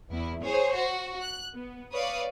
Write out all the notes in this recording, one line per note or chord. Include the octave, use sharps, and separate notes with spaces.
E2 E4
G#4 C5 C#5
F#4
F#6
B3
B4 C#5 D5 F5 D#6